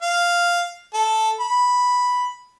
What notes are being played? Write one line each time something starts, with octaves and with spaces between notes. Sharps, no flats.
F5
A4
B5